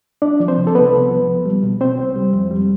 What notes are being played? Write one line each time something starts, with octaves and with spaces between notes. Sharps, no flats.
C2 D4 D5
F3
C4 C5
C3
A4
C2 B3 B4
C2
F3
C2
G3
B2
C2 C4 C5
C2
G3
F2
G3